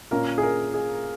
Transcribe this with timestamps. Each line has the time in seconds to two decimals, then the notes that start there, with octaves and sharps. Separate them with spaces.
0.11 A#2 A#3 C#4 A#4
0.38 G#4
0.43 A#4
0.74 G#4